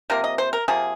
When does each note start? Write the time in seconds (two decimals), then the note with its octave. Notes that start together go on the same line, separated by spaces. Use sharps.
0.10 C3 F3 A#3 A#4
0.24 D#5
0.38 C5
0.53 A#4
0.68 C3 F3 A#3 G#4